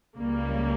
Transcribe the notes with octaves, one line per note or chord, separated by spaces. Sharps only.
C#2 C#3 G3 A#3